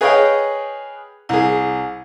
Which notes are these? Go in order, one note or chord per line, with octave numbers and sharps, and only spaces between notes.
G#4 B4 C#5 D#5 F5 G5
C2 G#4